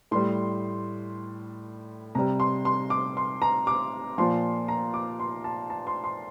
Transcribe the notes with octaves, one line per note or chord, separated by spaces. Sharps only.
A2 G3 C6
C3 G3 A#5
C6
C6
D6
C6
A#5
D6
A#2 F3 C6
A#5
D6
C6
A5
A5
C6
C6